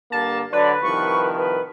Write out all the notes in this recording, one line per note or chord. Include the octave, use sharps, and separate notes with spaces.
G2 D3 A#3 A5
D3 F#3 D4 B4 D5
C2 D#3 F3 C#6
B4